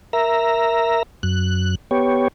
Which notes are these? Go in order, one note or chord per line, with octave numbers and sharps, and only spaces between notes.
A#4 E5 A#5
F#2 F#6
B3 G4 C#5